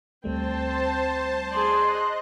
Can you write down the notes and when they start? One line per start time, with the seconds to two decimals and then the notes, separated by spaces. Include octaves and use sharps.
0.24 D2 G3 A3 C4 C5 G5 A5
1.51 G#4 D5 D#5 C6 F#6